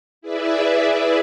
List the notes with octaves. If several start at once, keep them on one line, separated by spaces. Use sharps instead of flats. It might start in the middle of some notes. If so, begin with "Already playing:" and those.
E4 G#4 B4 D5 E5